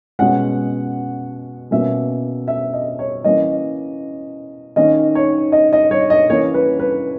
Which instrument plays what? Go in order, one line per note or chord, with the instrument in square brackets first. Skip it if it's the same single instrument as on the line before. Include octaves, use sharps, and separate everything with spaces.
[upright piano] B2 G#3 C#4 F#5
B2 A#3 C#4 E5
E5
D#5
C#5
E3 A#3 C#4 D#5
D#3 A#3 C#4 D#5
C#5
D#5
D#5
C#5
D#5
E3 A#3 C#4 C#5
B4
B4